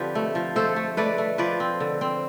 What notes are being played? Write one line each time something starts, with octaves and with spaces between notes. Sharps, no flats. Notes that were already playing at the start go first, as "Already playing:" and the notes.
Already playing: D3 F3 C4 G4 B4
A3
F3
A3 A4 C5
A3
A3 B4 D5
A3
F3 B4 D5
C4
D3
C4